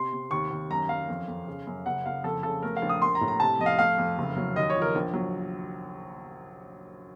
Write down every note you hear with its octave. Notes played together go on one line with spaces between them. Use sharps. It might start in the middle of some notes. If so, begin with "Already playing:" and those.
Already playing: C3 C6
C3
D#2 C#6
D#2
F#2 A#5
F#2 F5
F2
F2
C#3
F#2
F#1 F#5
F#1 F5
F2 A4
C#3 A4
A3 A#4
F5
A#1
D#6
A#3 C6
A#5
A2
A#5
C3 A5
F2 D#5
F5
A3 F5
F2
F#1
F#3
D#2 D#5
C#5
F3
A#4
A#1
F#3